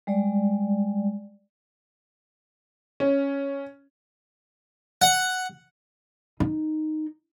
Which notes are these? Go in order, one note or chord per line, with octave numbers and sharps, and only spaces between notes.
G3 G#3 D5
C#4
F#5
D#4